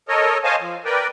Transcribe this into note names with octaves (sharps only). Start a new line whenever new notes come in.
A4 A#4 C#5 D#5
C5 C#5 D#5 F5 G#5 A5
F3
A#4 B4 D5 G5